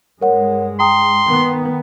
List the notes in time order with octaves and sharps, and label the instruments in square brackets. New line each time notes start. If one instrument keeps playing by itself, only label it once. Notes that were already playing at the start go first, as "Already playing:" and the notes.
[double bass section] G2 G#3 [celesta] A#4 C#5 F#5
[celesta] G5 A#5 D#6 [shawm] C6
[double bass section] D#3 B3